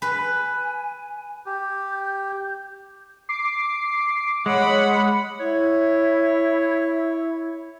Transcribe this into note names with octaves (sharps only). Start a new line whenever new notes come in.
B4 G#5
G4 G6
D6 C7
G#3 C#5 F#5 B5
E4 C#5